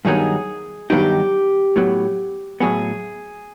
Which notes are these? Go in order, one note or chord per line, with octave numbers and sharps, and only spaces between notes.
G2 D#3 F#3 B3 D#4 G#4
G2 D#3 F#3 B3 D#4 G4
A2 F#3 B3
A2 F#3 B3 G#4